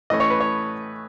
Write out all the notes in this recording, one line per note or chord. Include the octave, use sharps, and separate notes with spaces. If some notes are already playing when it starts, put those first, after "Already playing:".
A2 E3 A3 C#4 D#5
C#5
B4
C#5